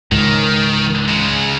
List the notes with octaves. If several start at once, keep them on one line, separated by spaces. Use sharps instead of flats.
C#2 G#2 D#3
C#3 G#3